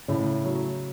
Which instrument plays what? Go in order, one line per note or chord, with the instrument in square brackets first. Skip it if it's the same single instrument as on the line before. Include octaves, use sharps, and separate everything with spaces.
[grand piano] A2 [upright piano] C#3
[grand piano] F#3